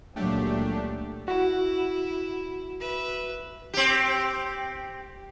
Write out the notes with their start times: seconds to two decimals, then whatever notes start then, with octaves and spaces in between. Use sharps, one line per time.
0.16 C#2 A#2 F#3 A3 D4 G4
1.28 E4 F#4
2.81 B4 E5
3.74 C4 G4